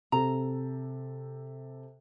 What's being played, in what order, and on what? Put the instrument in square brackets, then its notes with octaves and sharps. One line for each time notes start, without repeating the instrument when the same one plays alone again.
[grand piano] C3 A4 [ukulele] A#5